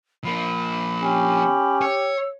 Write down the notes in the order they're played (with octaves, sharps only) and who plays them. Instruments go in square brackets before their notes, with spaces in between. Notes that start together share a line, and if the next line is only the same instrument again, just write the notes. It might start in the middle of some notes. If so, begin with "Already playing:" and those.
[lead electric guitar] F3 A#3 [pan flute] B5
[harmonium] C#4 [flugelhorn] G4
[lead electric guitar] C#5 [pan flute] E6